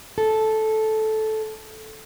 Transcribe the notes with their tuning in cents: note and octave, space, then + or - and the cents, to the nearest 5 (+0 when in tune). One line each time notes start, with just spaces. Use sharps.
A4 -10